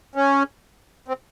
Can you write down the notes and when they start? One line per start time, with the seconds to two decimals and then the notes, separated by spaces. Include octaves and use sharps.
0.15 C#4
1.08 C4